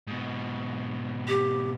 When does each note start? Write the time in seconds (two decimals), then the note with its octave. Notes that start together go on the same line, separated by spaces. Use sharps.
0.07 G#2 B2
1.28 G4